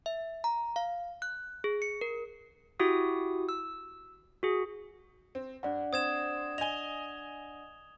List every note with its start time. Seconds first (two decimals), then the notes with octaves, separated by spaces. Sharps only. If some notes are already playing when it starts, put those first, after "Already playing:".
0.06 E5
0.44 A#5
0.76 F5
1.22 F#6
1.64 G#4
1.82 C#7
2.01 A#4
2.80 E4 F#4 G4 D#6
3.49 E6
4.43 F#4 G#4
5.35 C4
5.63 G2 D4 D5 F#5
5.93 C4 D#6 G#6 E7
6.58 D#5 G#5 F7 G7